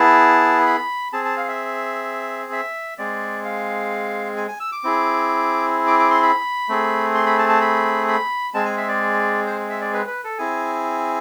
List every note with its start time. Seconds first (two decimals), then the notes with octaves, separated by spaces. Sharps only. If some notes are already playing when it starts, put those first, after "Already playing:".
Already playing: B3 E4 G#4 A5
0.67 B5
1.13 C4 G#4 A5
1.25 A5
1.37 F5
1.48 E5
2.52 E5
2.98 G#3 C4 G#4 D5
3.45 F5
4.37 G#5
4.48 G#5
4.60 E6
4.72 D6
4.84 C4 E4 G#4
5.87 D6
5.99 D6
6.11 C6
6.22 B5
6.69 A3 C4 G#4
7.15 C6
7.27 B5
7.39 A5
7.49 A5
7.61 B5
8.08 B5
8.54 G#3 C4 G#4 A5
8.65 G#5
8.78 E5
8.89 D5
9.47 C5
9.70 E5
9.81 D5
9.93 B4
10.08 B4
10.24 A4
10.38 C4 E4 G#4 G#5